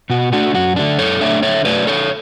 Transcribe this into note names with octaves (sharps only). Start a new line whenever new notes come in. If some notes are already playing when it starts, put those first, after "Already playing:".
B2 F#4
A3 D4 F#4
F#2 F#4
D3 A3 D4
F#2 A4 C#5
D3 A3 D4 C#5 E5
D3 C#5 E5
F#3 A3 B4 D5
D3 A4 C#5